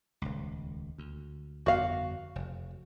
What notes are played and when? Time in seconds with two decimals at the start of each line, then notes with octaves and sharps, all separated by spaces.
0.22 D#1 C#2
0.98 D2
1.66 G1 F2 B3 F#4 F5
2.36 F1